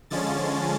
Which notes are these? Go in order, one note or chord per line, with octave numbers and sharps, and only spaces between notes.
D3 F3 G#3 C#4 A6